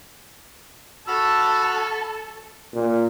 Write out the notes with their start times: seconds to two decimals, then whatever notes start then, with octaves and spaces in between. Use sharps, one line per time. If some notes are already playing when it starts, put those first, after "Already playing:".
1.07 F#4 A4 A5 B5 E6 F6
2.74 A#2